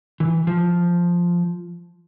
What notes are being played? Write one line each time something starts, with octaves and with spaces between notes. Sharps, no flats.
E3
F3